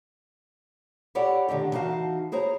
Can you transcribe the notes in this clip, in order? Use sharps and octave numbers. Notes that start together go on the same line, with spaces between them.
E4 G4 A4 C#5 D5 F#5
A2 D3 D#3 A#3 G4
E3 D#4 F#4 F5 A5
E4 G#4 C5 C#5 A#5